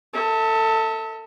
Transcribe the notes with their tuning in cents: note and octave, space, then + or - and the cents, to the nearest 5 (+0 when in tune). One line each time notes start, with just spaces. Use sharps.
A4 +20 E5 -30